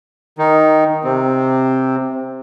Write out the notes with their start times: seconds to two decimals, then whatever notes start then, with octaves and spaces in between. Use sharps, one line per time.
0.38 D#3 D#4
1.04 C3 C4